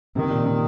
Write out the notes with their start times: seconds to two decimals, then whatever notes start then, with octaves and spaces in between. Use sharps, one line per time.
0.16 C3 D#3
0.30 A#2
0.46 C3